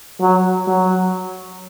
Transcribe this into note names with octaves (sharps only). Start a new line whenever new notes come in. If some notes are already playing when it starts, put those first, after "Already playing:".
F#3
F#3